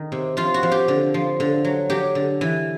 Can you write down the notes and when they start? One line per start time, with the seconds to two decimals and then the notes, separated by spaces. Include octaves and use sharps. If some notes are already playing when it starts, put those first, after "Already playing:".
Already playing: D#3
0.12 C3
0.37 F3 F4
0.54 F#4
0.63 F3
0.72 G4
0.88 D3
1.14 F3
1.40 D3
1.65 F#3
1.90 F#3 G4
2.15 D3
2.41 E3